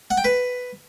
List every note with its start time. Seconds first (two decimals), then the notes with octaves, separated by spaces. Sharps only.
0.11 F#5
0.17 G5
0.24 B4